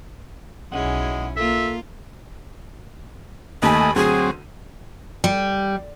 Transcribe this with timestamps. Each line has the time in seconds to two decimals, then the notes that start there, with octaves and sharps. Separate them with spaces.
0.72 B1 G#3 C#4 E4 G#4 F#5
1.37 A#3 F4 A4 E5
3.62 D#2 A3 D#5 G#5 B5
3.96 D2 F#3 C4 G#4 C6 D#7
5.24 G3